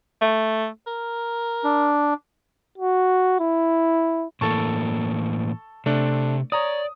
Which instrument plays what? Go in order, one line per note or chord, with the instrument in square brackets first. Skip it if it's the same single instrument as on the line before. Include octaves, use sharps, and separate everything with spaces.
[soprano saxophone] A3
A#4
[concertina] D4
[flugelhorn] F#4
E4
[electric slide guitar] A2 E3 A#3 [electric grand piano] A4 A5 C#6
[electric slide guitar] C3 [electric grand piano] A3 D4
[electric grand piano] C#5 A#5 D#6 [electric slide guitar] D5